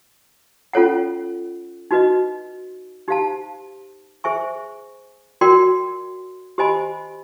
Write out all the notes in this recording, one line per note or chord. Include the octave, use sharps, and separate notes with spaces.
C#4 F4 A4 C#5 F#5
D#4 F#4 B4 D#5
D#4 G4 C5 F5 A5
G#4 C5 E5 G#5 C#6
F#4 A#4 D5 G5 C6
G4 C5 D#5 G#5 B5